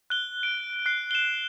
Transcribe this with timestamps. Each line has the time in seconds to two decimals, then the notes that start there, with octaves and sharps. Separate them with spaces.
0.10 F#6 G7
0.43 D7
0.86 F#6 C7
1.11 E7 G7